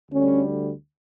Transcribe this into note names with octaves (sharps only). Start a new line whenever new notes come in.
D2 D3 G3 C#4